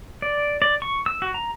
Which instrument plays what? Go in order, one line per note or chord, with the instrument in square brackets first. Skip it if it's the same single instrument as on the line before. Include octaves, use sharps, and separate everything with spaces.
[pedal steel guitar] D5
D5
C#6
E6
F#4
A#5